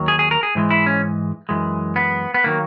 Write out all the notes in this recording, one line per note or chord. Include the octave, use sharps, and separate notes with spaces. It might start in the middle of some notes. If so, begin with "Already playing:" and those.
Already playing: D#2 D#3 F#3
G#4
G#4
A#4
G#4
G#2 E3 G#3
E4
C#4
F#2 E3 G#3
B3
B3
D#3 F#3 A#3